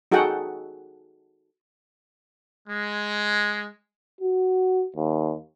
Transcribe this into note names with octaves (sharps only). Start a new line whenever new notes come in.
D#4 F#4 G#4 A4 F#5 G5
G#3
F#4
D#2